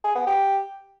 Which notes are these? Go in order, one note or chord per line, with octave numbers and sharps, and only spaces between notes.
G#4
B3
G4